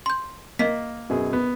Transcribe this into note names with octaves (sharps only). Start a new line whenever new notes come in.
C6 G6
A#3 D#5 B6
F#2 B2 G#4
B3